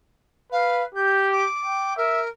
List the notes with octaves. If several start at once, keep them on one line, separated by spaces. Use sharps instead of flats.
B4 F5
G4 G6
D6
G5
A#4 E5